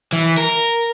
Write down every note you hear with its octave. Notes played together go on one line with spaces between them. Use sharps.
E3
A#4